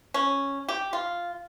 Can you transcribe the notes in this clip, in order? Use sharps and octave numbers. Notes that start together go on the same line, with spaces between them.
C#4
G4
F4